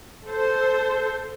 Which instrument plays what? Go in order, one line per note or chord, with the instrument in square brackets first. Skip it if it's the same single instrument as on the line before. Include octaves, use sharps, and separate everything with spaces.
[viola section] A4 C5